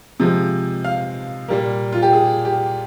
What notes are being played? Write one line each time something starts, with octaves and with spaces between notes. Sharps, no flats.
C3 F3 G#3
F5
A#2 G3 A#3
F4
G4
G#4
G4